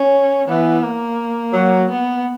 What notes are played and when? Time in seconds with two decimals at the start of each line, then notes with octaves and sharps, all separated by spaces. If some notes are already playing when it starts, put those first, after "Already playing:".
Already playing: C#4
0.48 E3 B3
0.83 A#3
1.53 F#3
1.89 B3